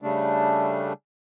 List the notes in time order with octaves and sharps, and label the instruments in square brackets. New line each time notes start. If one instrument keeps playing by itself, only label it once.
[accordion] C#3 G3 A3 D4